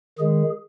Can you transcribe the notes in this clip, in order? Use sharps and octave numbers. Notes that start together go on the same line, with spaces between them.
D#3 G#3 G#4